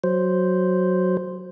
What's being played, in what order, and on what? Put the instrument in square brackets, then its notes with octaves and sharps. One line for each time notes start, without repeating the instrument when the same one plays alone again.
[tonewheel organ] F#3 C5